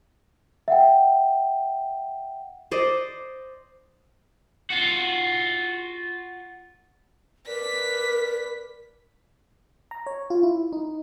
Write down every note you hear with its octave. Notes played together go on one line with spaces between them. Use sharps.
E5 F#5 G5
C5 D5 D#5
F4 F#4
A#4 B4 D5 B6
A#5
C#5
F4
E4
D#4